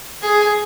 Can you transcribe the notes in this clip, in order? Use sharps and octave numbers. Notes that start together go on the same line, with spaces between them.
G#4